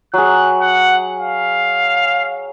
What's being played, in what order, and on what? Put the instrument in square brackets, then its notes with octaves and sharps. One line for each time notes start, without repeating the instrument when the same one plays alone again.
[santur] F#3 G#4 [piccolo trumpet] F#6
[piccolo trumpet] F#5
F5